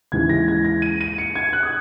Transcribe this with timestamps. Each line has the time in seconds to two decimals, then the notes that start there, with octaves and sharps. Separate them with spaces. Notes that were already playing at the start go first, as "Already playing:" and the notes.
0.12 D#2 C#3 E3 G#3 G#6
0.29 A#6
0.48 G#6
0.65 A#6
0.82 D#7
1.01 D#7
1.18 C#7
1.35 G#6
1.53 F#6
1.63 D#6